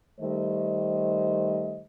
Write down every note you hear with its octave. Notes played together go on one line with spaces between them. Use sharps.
D#3 G3 A3 C5 D#5